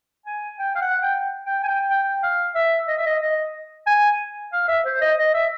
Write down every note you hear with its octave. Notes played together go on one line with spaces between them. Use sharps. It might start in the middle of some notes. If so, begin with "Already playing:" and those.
G#5
G5
F5
F#5
G5
G5
G#5
G5
G5
F5
E5
D#5
E5
D#5
D#5
G#5
F5
E5
C5
D#5
D#5
E5